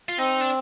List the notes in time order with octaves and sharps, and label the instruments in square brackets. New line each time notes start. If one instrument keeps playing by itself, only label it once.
[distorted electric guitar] F4
[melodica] C4 [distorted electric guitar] D#4
[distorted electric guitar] D4